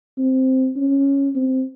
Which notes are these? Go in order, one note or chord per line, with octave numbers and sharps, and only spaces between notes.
C4
C#4
C4